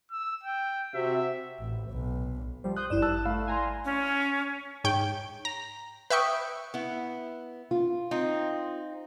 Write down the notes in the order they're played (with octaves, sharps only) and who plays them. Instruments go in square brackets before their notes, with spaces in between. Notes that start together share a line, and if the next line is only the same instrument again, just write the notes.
[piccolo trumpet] E6
G5
[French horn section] C3 F#4 [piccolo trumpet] E5
[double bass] A1
B1
[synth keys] F3 G3 [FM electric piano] C5
[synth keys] C6 D#6 G6 [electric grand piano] F#6
[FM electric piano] G#1 E4 D5 [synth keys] G2 E7
[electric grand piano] A5 E6 F#6
[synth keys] A3 [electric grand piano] F5 B5
[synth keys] G#5 A#5 C6
[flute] C#4
[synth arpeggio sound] G#2 C#5 G5
A#5
B4 E5 G5 C#6 D#6
[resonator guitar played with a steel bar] B3 E4
[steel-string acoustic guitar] F4
[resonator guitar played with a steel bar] C4 D#4